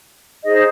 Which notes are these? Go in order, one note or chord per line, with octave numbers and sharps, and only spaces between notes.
D#4 G#4 C5 D#5